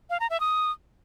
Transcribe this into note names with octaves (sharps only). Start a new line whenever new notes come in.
F5
A#5
E5
D#6